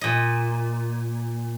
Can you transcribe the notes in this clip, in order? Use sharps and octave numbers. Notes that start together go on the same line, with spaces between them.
A#2 D#5